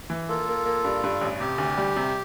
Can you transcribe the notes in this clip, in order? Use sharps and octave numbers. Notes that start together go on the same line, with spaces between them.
E3
A#3 F4 A4
A#3
A#3
G2
G2
A1
C3 G4
D2
G3
C3